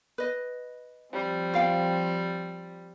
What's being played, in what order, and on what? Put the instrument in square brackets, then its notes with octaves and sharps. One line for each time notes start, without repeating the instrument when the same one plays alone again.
[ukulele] B4 D#5
[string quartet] F3 G3 C4
[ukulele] F4 F5 G5